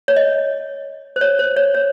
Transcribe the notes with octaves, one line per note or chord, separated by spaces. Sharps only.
C#5
D#5
C5
C#5
C5
C#5
C#5